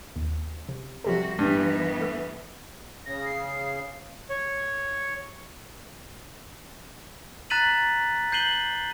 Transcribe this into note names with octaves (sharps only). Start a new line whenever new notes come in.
D#2
C3
C3 F3 G3 F#4 A4
G2 E3 B3
A3 E5
C#3 A#6
C7
C#5
A#5 F#6 A6 B6 D#7 F#7
G6 C7 D#7 F#7 G7